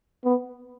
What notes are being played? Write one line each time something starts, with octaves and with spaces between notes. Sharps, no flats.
B3